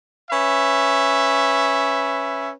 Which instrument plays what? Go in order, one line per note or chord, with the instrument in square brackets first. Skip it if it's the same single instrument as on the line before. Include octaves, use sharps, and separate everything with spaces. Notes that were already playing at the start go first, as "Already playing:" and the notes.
[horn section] C#4 B4 E5